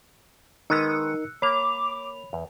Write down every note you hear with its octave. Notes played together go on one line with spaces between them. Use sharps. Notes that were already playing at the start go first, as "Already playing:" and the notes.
D#3 G#3 B3 D#4 A#4 E6 F#6 C#7
A#3 C#5 B5 D6 F7
E2